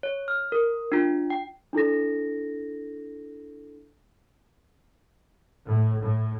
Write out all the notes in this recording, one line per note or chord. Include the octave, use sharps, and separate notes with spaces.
C#5
F6
A#4
D4 F4
G5
D4 E4 A4 A#6
A2
A2